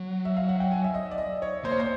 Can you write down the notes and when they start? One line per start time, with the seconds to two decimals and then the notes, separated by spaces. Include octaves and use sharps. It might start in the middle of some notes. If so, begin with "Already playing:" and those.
Already playing: F#3
0.25 E5
0.37 F5
0.49 F#5
0.60 G5
0.72 G#5
0.84 E5
0.94 D#5
1.11 D5
1.18 D#5
1.42 C#5
1.64 A#3 C5
1.72 C#5
1.80 C5